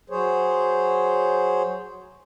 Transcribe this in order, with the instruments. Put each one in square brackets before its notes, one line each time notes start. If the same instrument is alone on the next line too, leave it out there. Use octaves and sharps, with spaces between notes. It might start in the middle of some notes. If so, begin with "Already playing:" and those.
[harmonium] F#3 G#4 C5 C#5